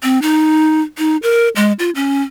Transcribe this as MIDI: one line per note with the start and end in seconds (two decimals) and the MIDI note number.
0.03 0.19 60
0.22 0.81 63
0.98 1.17 63
1.23 1.48 70
1.56 1.72 56
1.79 1.90 65
1.95 2.22 61